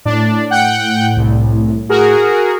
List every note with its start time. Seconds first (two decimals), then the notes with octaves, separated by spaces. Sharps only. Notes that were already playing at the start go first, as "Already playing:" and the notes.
0.05 A2 D4
0.50 F#5 G5 G6
1.16 C2
1.89 F#4 G#4 A#4